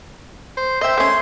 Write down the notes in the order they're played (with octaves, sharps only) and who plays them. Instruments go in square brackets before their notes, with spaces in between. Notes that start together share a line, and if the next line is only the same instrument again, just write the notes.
[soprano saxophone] C5
[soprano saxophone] C5 [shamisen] D#5 G5 [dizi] E5
[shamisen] A3 C#4 [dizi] C6